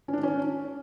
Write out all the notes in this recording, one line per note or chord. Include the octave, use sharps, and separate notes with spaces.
C#4
D4
D#3
C#4